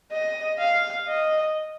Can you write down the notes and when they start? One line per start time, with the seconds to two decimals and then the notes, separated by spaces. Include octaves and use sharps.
0.12 D#5
0.60 F5
1.07 D#5